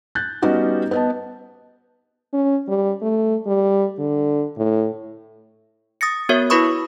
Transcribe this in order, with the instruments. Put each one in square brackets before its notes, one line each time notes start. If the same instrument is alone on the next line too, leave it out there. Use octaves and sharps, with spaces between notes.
[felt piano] F#6 G6 A6
G3 B3 C#4 D#4 F#4 G4
B3 D#5 A5
[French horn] C#4
G3
A3
G3
D3
A2
[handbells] D#6 A6 A#6 C#7
B3 F#4 A#4 C#5 E5
E4 F#4 B4 B5 C#6 D#6